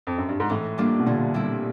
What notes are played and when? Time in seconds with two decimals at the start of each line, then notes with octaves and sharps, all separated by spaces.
0.07 F2
0.18 F#2
0.29 G2
0.40 G#2
0.50 A2 E3
0.78 G3 A#3 D4 F4
0.99 B2
1.06 A#2 D3
1.34 G3 C4 E4